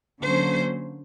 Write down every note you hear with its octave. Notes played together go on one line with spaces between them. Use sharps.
D3 F#3 A#3 C#4 C5